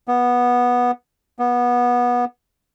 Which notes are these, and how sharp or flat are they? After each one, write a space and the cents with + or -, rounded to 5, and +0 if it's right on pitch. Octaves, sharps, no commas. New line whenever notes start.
B3 -10
B3 -20